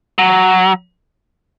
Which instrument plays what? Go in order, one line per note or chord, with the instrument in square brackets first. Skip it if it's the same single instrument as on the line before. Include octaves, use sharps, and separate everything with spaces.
[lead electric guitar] F#3